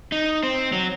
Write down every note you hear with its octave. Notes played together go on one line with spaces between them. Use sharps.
D#4
C4
F#3